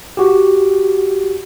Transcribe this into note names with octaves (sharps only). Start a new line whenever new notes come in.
F#4 G4